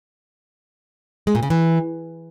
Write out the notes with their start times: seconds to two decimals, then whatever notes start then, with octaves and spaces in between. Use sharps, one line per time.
1.27 G#3
1.35 A#2
1.43 C#3
1.50 E3